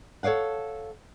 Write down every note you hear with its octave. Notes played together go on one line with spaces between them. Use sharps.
A4 C#5 D5 F5 F#5